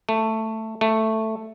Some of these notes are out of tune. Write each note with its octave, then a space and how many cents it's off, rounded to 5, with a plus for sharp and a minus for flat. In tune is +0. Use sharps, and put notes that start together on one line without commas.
A3 +10
A3 +5